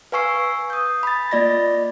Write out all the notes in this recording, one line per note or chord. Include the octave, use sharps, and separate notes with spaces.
B4 F5 G#5 C#6 E6 C7
D#6 G6
B5 A6
A#3 F4 D5 D#5 B5 A#6